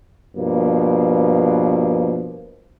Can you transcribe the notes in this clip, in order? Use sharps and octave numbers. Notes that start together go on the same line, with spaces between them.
G2 B2 F3 A#3